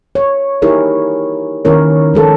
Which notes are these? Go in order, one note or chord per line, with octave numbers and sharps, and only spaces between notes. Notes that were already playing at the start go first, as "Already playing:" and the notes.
C#5
D#4 E4 G4 G#4 A#4 C#5
D#3 C#4 E4 A#4 C#5
F3 G#3 A4 A#4